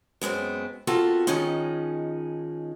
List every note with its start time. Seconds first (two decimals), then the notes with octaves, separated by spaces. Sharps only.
0.21 F#2 G#3 B3 C4
0.87 B3 C4 F4 F#4 A4 A#4
1.27 D#3 F3 G#3 C#4 D#4